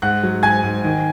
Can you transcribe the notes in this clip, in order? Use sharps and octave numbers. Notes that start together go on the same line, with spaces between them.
G#2 F#5 F#6
F#3
G#2 G#5 G#6
G#2
D#3